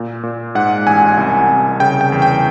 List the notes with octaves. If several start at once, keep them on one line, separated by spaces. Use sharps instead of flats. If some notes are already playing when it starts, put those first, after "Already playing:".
Already playing: A#2
A#2
G#2 F#5
A1 G#5
C2
C2
C#3 G5
G5
E2
G5